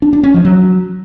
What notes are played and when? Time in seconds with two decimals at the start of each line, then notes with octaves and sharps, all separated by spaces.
0.02 D4
0.13 D4
0.23 C#4
0.34 F3
0.45 F#3